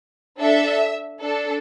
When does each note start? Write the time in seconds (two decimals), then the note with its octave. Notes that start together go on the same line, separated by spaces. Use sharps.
0.39 D4 A4 E5
1.21 D4 A4